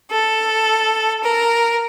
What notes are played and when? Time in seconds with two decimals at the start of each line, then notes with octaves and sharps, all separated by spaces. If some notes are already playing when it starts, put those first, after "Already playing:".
0.11 A4
1.24 A#4